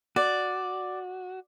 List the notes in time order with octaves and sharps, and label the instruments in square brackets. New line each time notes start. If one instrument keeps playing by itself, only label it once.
[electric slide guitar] F#4 [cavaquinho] D5